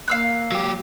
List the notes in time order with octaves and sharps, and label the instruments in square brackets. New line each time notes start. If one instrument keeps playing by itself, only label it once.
[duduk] A#3 [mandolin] F5 E6 F#6
[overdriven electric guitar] F#3 G4